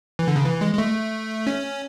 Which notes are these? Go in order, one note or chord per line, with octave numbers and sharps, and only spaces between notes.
E3
D3
C#3
E3
G#3
G#3
A3
C#4